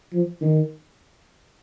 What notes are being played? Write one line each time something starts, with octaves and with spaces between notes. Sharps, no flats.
F3
D#3